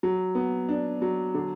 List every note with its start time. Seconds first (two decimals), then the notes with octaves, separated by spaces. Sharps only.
0.03 F#3
0.35 B3
0.69 D4
1.02 F#3
1.34 D3